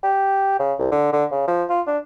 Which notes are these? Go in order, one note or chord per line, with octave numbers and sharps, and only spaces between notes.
G4
C#3
C2
D3
D3
C#3
F3
F4
D4